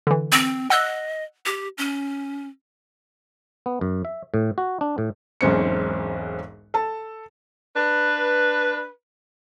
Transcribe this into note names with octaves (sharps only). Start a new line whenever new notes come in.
D3 E3
C4
D#5 F#5 E6 F#6
G4
C#4
B3
F#2
E5
A2
F#4
D4
A2
E1 B1 G#2 C4 C#4 C#7
A4 A5
D4 B4